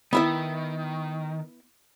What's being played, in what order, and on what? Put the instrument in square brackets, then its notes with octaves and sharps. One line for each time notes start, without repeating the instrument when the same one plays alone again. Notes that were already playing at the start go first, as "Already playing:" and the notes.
[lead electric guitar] D#3 [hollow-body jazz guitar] B3 E4 E5